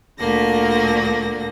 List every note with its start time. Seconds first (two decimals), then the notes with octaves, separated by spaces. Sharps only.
0.18 D2 A#2 D3 A#3 A#6